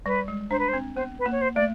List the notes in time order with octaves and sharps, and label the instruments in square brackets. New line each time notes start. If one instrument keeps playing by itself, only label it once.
[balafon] G3 [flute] B4
[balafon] G#3
[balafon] D4 [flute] C5
[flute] B4
C5
[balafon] C4
[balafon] B3 [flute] C5
[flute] B4
[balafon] A#3
[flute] C#5
C5
[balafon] A3 [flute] D5